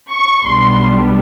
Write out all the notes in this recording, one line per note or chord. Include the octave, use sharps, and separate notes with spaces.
C#6
B1 B2 G3 B3 D4 C6